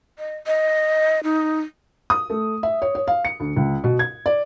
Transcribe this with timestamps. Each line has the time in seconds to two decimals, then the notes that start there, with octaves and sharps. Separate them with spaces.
0.19 D#5
0.47 D#5
1.24 D#4
2.10 D#6
2.30 A3
2.63 E5
2.82 C#5
2.95 C#5
3.08 F5
3.25 C#7
3.40 D2
3.57 C#2
3.84 B2
3.99 G#6
4.26 D5